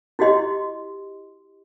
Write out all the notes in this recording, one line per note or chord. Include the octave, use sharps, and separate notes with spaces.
E4 F#4 G4 D#5 C6